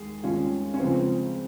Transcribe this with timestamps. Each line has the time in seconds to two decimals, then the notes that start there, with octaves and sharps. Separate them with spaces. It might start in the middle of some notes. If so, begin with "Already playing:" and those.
Already playing: D#2 G#3 G#4
0.23 D#2 D#3 G#3 C#4 F4
0.74 C#4
0.80 C#2 C#3 F3 G#3 C4